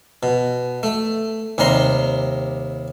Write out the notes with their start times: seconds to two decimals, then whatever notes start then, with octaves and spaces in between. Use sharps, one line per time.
0.23 B2
0.83 A3
1.58 D#2 C3 G3 A#5 C6